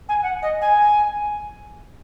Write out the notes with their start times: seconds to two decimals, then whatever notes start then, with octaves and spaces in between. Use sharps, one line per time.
0.08 G#5
0.22 F#5
0.42 D#5
0.61 G#5